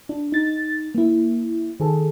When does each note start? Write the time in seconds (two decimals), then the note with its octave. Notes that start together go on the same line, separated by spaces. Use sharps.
0.09 D4
0.32 D#4 A6
0.95 A#3 E4
1.80 D#3 G#4 A4